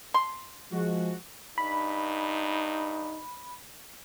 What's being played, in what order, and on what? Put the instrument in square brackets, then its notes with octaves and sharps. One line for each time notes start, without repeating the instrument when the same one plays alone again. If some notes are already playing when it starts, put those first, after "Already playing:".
[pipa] C6
[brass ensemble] F3 G#3 F#4
[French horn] G2 [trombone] D#4 [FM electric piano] B5